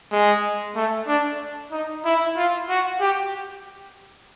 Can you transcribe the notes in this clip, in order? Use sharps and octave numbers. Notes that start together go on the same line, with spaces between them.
G#3
A3
D4
D#4
E4
F4
F#4
G4